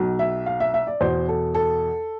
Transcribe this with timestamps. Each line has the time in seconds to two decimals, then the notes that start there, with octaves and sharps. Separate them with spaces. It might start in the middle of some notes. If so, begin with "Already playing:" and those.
Already playing: B1 B2
0.19 E5
0.46 F5
0.60 E5
0.74 E5
0.87 D5
1.01 E2 B2 C5
1.29 A4
1.55 A4